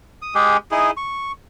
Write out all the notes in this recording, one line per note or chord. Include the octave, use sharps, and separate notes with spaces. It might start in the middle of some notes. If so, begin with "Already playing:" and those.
D#6
G#3 G4 G#4
D#4 E4 G#4
C#6